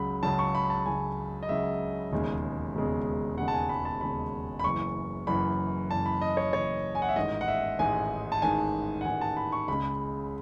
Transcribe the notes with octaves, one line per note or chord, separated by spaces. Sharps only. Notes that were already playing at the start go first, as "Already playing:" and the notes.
Already playing: C#2 C#3 F#3 B5
C#2 C#3 F#3 A5
C#6
B5
A5
C#2 C#3 F#3 G#5
D#5
C#2 C#3 F#3 E5
E1 D#2 C#3 G#3
E1 D#2 C#3 G#3
E1 D#2 C#3 G#3 F#5
A5
G#5
B5
A5
E1 D#2 C#3 G#3 B5
B5
F#1 F#2 E3 C#6
F#1 F#2 E3 B5
F#1 F#2 E3 A5
B5
D#5
C#5
F#1 F#2 E3 C#5
G#5
F#5
E5
A1 G#2 D#3 G#3 D#5
F#5
E5
A1 G#2 D#3 G#3 G#5
A5
A1 G#2 D#3 G#3 G#5
F#5
A1 G#2 D#3 G#3 G#5
A5
B5
C#6
C#2 C#3 G#3 B5